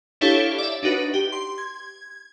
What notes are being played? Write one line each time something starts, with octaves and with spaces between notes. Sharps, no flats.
D4 E4 G4 A4 C#5 F5
D5 E5
D4 D#4 F#4 B4
G4
C6
G#6